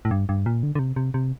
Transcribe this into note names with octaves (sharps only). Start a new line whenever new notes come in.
A2
G2
G2
A#2
D3
D3
C3
C3
C3